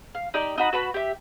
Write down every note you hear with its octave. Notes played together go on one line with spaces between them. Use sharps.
F5
D#4 G4 D5 G5
D#4 F#4 B5
F#4 B4 A5 B5
G4 E5